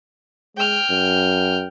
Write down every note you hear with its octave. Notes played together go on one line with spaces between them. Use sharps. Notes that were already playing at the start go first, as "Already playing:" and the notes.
G#3 G5 F6
F#2